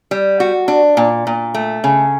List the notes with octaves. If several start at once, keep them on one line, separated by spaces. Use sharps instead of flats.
G3
F#4
D4
A#2
A#2
A3
C#3